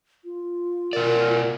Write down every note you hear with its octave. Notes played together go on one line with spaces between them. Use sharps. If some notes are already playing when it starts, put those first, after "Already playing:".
F4
B2 A#4 D5